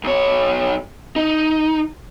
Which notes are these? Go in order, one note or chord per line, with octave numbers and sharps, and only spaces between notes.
B1 C#5
D#4